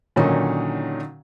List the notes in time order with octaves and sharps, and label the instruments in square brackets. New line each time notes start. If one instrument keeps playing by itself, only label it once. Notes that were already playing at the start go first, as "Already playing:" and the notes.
[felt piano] A#2 D3 D#3 F#3 C#4 D#4